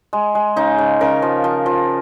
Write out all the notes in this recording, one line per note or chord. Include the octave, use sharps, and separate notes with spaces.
G#3
G#3
C#3 D#4
C#3
C#3 A#4
F3
F3
F3